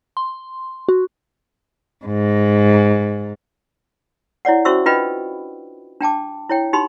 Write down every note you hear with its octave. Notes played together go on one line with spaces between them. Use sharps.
C6
F#4
G#2
E4 C#5 D5 F#5
C#4 F#4 C5 E5 C#6 E6
D4 F4 B4 D#5 G5 B5
D4 G5 A5 D6
E4 C#5 G5
D#4 G4 B5 C6